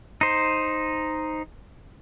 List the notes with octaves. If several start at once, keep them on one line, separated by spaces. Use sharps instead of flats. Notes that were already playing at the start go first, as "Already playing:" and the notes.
D#4 C5